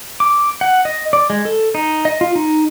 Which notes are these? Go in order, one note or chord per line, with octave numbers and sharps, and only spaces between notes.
D6
F#5
D#5
D5
G#3
A4
D#4
D#5
F4
D#4